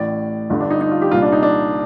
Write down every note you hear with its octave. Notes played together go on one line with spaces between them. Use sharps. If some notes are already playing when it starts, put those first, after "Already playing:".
Already playing: A1 A2 D5
G1 G2 D3 D4
D4
D#4
D#4
F4
G4
C2 A#2 F4
D4
D#4
D4